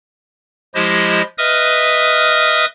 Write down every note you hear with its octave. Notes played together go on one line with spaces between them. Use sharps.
F3 G#3 E4 G4 C5 D#5
B4 D#5 E5 D#6 F6